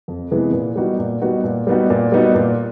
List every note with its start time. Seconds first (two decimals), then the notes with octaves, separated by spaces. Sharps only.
0.08 F2
0.31 C3 E3 G#3 B3
0.53 A#2
0.76 G3 B3 D#4 F#4
0.99 A#2
1.22 G3 B3 D#4 F#4
1.44 A#2
1.67 G3 B3 D#4 F#4
1.90 A#2
2.12 G3 B3 D#4 F#4
2.35 A#2